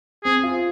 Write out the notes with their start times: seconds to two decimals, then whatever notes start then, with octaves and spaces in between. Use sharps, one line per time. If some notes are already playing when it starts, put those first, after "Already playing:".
0.24 C4 G#4
0.43 F4